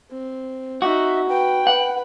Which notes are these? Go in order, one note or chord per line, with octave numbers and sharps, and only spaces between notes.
C4
D#4 F#4 E5
B4 G5
B4 F#5